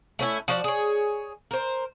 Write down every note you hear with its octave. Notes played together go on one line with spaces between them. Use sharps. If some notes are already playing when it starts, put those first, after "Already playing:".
A3 C#4 E4
F3 F#4 D5
G#4 C#5
A#4 C5